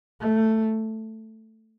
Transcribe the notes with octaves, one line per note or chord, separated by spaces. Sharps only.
A3